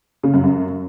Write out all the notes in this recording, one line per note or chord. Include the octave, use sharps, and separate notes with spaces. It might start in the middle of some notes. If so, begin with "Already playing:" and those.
C#3
F#2
F#2